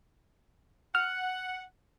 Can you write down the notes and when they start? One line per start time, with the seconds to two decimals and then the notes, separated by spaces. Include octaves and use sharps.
0.95 F#5 F6